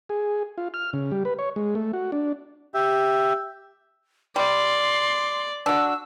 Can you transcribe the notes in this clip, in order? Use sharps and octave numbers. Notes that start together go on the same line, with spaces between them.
G#4
F4
F6
C#3
G3
B4
C#5
G#3
A3
F#4
D4
G4 E5
G3 D5 C6
D4 F#4 E6